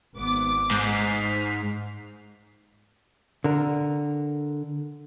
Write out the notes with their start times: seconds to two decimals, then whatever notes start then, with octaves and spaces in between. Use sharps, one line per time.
0.15 G#1 B3 D6
0.71 G#2 F6 B6 C7
3.44 D3 A#4